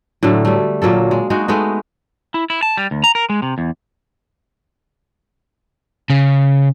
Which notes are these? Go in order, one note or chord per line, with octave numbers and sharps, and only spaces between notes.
A2 D3 F#3 A3
G3 A3
A#2 F#3 A#3 A4
G#3
G#3 D#4 F#4
G#3 A3 B3 D#4
E4
E4
A5
G3
D2
A#5
A#4
G#3
C3
E2
C#3